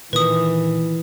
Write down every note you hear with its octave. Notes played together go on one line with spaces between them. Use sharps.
A#2 D#3 E3 B4 D#6